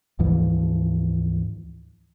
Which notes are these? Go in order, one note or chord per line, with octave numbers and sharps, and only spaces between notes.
D2 G#2 E3 F3